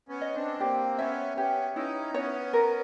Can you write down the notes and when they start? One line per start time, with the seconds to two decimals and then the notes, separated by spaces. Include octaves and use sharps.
0.09 B3 C#4
0.21 D#5
0.34 C4 D4
0.60 A#3 C4 G4
0.99 B3 C#4 E5
1.38 B3 C#4 G4
1.76 C#4 D#4 E4
2.14 B3 C#4 C#5
2.53 A#4